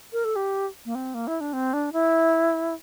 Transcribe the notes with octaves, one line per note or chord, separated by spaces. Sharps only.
A#4
A4
G4
A#3
C4
A#3
E4
D4
C4
D4
E4